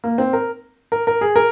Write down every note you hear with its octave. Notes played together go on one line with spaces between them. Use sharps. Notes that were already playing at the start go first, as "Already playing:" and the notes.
A#3
C4
A#4
A#4
A#4
G#4
A#4